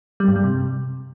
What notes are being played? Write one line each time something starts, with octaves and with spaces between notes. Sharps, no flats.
G3
G2
G3
C3